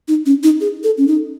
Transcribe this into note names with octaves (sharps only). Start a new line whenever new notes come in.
D#4
C#4
D#4
G#4
A4
C#4
D#4